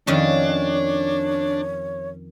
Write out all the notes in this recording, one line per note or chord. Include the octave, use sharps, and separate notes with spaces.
F2 D#3 C#4 D4 C#5